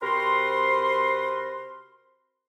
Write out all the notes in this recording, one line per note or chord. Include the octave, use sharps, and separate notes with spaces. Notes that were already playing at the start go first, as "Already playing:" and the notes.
C3 C4 F#4 A#4 B4 C6